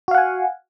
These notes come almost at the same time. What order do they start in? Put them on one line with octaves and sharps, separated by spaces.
F#4 F5 F#5 G#5